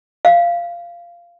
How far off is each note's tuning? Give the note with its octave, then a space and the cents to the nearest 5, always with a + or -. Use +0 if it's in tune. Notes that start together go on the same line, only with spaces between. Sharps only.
F5 -15